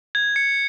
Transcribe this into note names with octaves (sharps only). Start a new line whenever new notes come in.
G#6
C#7